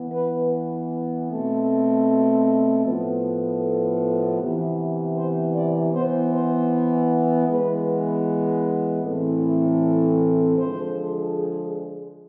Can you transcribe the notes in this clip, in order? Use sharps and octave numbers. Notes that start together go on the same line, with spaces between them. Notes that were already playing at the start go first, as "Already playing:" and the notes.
Already playing: E3 B3
B4
B2 A3 C4
A2 F3 B3
A4
C3 E3 B3
C5
D5
E3 B3 C5
C5
E3 G#3 B3 B4
A2 E3 A3 C4
D3 F3 G#3 C5
G#4